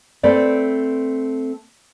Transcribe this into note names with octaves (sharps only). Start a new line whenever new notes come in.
A3 C4 B4 D5